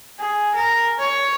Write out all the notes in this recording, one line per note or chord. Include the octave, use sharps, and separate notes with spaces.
G#4
A#4
C#5